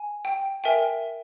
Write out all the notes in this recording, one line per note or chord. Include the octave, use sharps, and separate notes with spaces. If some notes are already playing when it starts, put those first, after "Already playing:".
Already playing: G#5
G5
A#4 E5 G5 G#5